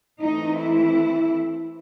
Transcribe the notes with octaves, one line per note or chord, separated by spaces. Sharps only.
E3 A3 C4 D#4
E4